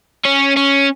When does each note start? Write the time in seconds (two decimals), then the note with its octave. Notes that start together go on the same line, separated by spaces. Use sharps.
0.25 C#4
0.56 C#4